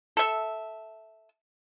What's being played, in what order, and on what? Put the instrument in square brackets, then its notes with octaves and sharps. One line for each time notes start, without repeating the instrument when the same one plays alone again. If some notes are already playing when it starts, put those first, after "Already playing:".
[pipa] A4 E5